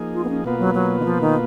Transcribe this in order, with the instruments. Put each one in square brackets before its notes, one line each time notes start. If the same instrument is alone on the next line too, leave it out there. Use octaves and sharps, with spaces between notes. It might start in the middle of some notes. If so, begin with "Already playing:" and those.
Already playing: [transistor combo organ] F3 A#3 D#4 G#4
[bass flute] F4
B3
C#4
[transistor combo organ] B2 A#3 F4 B4 [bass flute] B3
[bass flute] F#3
F#3
D#3
F3
D#3